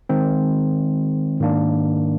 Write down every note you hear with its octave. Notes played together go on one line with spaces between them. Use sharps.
D#3 G#3 C4
G#2 D#3 A#3 D4